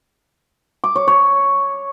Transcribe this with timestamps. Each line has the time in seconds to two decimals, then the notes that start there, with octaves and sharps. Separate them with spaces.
0.84 D6
0.96 C#5
1.08 C#5